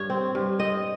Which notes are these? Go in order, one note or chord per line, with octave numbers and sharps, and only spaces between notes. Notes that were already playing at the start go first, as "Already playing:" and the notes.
Already playing: G2 C#5
C4
G2
C4 D#5